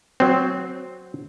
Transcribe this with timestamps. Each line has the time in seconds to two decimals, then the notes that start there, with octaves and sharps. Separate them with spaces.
0.20 F#3 C4